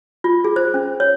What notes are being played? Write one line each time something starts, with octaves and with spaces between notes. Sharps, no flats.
F4
G#4
C5
C#4
C#5